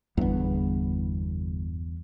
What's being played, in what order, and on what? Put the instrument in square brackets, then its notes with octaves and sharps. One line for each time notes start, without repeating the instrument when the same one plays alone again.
[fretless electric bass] G1 G2 [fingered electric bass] E2 B3